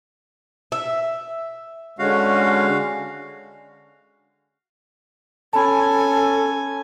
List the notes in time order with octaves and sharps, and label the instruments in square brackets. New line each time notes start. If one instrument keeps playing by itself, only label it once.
[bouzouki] E5
[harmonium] D3 G#3 C#4 [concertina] F#4 F5
[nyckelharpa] C#4 G#5 [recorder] A4 [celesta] A5 B5